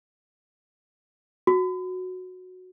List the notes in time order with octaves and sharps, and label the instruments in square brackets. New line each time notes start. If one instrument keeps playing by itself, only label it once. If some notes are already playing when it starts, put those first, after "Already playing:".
[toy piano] F#4